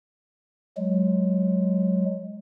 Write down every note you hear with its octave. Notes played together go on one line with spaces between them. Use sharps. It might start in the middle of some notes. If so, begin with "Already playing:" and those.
F#3 G#3